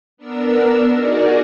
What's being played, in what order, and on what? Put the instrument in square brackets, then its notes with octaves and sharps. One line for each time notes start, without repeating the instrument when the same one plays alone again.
[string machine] B3 D4 A#4 E6
D#4 F#4 G#4 A#4 D5 D#5